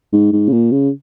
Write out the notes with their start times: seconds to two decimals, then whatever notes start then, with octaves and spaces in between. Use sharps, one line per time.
0.13 G#2
0.33 G#2
0.48 C#3
0.53 A#2
0.72 C#3